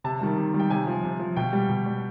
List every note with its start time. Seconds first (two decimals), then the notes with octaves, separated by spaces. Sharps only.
0.04 C3 A5
0.21 D#3 G3
0.37 C3
0.54 D#3 G3
0.60 G5
0.70 C3 G#5
0.87 F3
1.04 C3
1.20 F3
1.36 B2 G5
1.53 G3
1.69 B2
1.86 G3